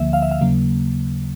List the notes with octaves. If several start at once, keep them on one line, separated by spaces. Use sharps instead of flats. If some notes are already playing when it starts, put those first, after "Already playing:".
Already playing: D2 D3 F3 A#3 E5
F5
E5
F5
D#2 C#3 F#3 A#3